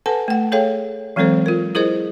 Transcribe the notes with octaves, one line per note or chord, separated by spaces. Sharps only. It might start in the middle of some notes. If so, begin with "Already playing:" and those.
A4 B4 F#5 G#5 A5
A3 F#5
G#4 A4 C#5 F5 G5
E3 F#3 G#3 C4 A4 C5
F4 A#4
E4 G#4 A#4 C5 D#5